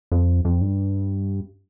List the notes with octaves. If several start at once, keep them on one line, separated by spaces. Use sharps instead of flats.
F2
F2
G2